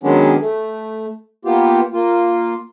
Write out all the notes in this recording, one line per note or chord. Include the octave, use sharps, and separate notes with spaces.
D#3 F#3 G#3 B3 C#4 D4
A3
A#3 B3 F4 G4
A#3 F4